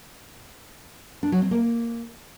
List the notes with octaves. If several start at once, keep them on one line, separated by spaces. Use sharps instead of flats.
D4
F#3
C4
A#3